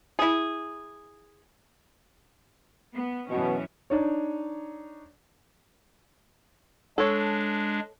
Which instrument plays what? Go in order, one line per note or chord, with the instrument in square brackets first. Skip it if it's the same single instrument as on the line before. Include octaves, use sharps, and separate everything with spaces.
[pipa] E4 G#4
[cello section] B3
[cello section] F#2 E3 C#4 [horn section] B2
[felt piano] D4 D#4 C#5
[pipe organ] G#3 D4 [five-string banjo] A4 C#5